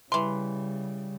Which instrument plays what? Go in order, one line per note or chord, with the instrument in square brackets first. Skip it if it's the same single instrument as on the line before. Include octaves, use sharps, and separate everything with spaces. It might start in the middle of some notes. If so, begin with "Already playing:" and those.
[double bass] C#3 G3 [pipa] E3 C6